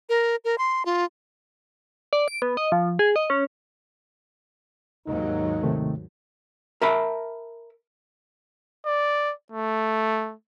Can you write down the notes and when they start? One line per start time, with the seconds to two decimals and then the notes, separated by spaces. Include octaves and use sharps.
0.09 A#4
0.45 A#4
0.58 C6
0.86 F4
2.13 D5
2.28 D7
2.42 B3
2.57 D#5
2.72 F3
2.99 G#4
3.16 D#5
3.30 C#4
5.07 D#2 G#2 F#3 D#4
5.63 C3 D#3 A3
6.81 A#4 E5 A5 B5
8.86 D5
9.52 A3